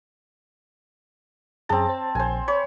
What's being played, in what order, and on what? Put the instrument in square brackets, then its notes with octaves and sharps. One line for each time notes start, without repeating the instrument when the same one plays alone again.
[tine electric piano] F#2 G#4 A#5 [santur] C4 A5
[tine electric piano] C5
[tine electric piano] A#1 [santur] C5 G#5
[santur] C#5 [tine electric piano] B5